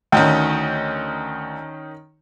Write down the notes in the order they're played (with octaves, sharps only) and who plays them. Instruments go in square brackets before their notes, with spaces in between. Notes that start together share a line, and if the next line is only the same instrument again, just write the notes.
[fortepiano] D2 [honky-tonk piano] D#3 C#4 D#4